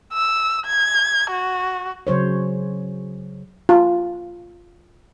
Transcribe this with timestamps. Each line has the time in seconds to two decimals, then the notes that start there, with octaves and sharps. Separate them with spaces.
0.13 E6
0.66 G#6
1.31 F#4
2.07 C#3 F#3 C5 C#5
3.69 F4